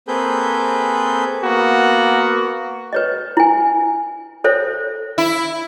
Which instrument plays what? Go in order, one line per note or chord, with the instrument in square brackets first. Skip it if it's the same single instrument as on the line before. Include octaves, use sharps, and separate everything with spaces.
[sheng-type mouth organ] A#3 C4 G#4 A4 B4 G6
[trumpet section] A#3 B3 F#4
[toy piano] B4 C#5 D#5
E4 G#5
A4 C5 C#5 E5
[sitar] E4